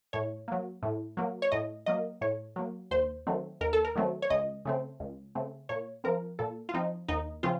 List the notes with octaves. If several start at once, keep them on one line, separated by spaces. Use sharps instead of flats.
A2 C#5
F#3 A#3
A2
F#3 A#3
C#5
A2 D#5
F#3 A#3 D#5
A2 C#5
F#3 A#3
D#2 C5
D#3 F#3 A3 C4
D#2 A#4
A4
A#4
D#3 F#3 A3 C4
C#5
C#2 D#5
C#3 A3 C4
C#2
C#3 A3 C4
A#2 C#5
F3 C4 A#4
A#2 A4
F4
F3 C4 D#4
D#2 D#4
C#3 F3 C4 F4